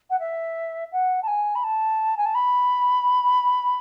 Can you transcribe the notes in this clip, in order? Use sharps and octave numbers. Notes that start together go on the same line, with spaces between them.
F#5
E5
F#5
A5
G#5
B5
A5
G#5
A5
B5